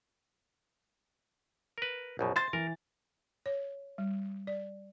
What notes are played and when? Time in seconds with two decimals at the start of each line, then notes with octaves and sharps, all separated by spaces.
1.78 A#4 B4
2.19 A#1 F#2 B2
2.36 C5 C6 A6
2.53 E3 A#4
3.46 C#5
3.98 G3
4.47 D5